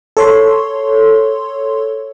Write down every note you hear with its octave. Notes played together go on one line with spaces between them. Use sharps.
A4 C#5 C6